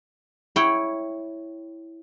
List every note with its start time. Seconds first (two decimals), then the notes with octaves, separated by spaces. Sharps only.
0.56 E4 C#5 G5